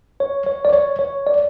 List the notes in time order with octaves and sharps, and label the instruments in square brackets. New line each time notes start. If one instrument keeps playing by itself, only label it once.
[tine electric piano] C#5
C#5
D5
C#5
C#5
D5